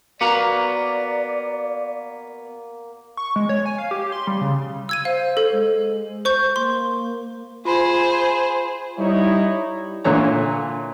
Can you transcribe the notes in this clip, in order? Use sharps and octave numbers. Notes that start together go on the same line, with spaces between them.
A#3 B3 F#4 D5 A#5
C#6
G#3
C#5
G#5
F5
G4
C6
G3
C#3
E6 G#6 D#7
C5 F5
A4
G#3
C5 C#6 G6
A#3 C6
F4 G#4 C5 B5 C6
G3 D#4 E4 C#5
A#2 D3 E3 C#5 A#5